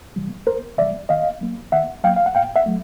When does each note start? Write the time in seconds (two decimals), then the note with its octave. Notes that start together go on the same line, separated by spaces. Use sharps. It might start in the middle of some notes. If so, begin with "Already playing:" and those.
0.16 C3 E3 G3
0.47 E2 A#4 C5
0.78 C3 E3 G3 D5 E5
1.09 D#3 D#5 F5
1.41 F#3 A#3
1.72 D#3 E5 F#5
2.04 F#3 A#3 F5 G5
2.16 F5
2.26 F#5
2.35 A2 F5 G5
2.56 E5 F#5
2.66 F#3 A3